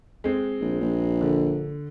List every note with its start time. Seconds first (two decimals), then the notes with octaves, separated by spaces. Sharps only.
0.24 G#3 C4
0.61 A#1
0.81 A#1
1.21 D3